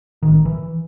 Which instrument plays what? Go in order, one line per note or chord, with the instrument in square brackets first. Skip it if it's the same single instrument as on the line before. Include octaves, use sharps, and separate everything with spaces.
[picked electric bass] A1 D#3
E3